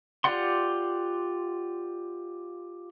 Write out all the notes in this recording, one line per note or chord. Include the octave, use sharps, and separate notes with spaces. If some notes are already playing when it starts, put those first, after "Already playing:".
F4 G4 D5 F#5 C6